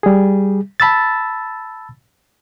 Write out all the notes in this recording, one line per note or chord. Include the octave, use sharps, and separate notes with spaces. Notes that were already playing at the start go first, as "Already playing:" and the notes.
G3 G#4
A5 B5 E6 A6